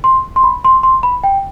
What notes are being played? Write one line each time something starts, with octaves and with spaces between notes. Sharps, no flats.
C6
C6
B5
C6
C6
B5
G5